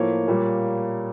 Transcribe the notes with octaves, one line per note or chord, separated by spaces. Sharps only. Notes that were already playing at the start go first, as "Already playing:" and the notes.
Already playing: A2 F3 A#3 C#5
A#2 G3 A#3